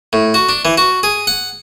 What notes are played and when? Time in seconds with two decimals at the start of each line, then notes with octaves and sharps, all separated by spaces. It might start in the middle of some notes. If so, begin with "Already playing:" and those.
0.13 A2
0.34 F#4
0.49 D4
0.65 E3
0.78 F#4
1.03 G#4
1.27 F#5